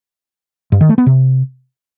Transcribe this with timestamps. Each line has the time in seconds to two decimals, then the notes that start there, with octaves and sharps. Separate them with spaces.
0.72 G2
0.81 D#3
0.89 A3
0.98 B3
1.06 C3